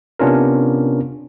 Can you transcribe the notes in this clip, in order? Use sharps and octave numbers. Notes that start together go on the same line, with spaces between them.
C3 B3 C#4 D4 F4 A#4